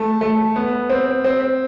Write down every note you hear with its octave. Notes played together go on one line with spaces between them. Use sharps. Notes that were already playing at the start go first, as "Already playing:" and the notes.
Already playing: A3
A3
B3
C4
C4